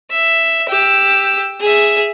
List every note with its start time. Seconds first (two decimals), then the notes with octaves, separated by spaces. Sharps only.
0.11 E5
0.68 G4 E6
1.60 G#4 E5